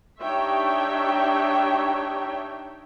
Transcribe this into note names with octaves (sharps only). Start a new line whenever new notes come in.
D4 D#4 G4 C#5 E5 G5